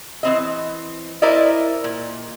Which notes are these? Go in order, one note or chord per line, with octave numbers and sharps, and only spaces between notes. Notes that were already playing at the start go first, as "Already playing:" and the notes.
E3 C4 D#5
E4 A#4 C5 D5 D#5
A#2